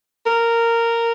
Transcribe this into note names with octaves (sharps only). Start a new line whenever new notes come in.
A#4